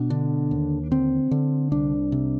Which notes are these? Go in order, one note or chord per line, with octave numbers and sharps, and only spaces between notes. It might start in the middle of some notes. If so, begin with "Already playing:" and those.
Already playing: B2 D4
D3
D#2
D3 C4
D3
C2 D4
C3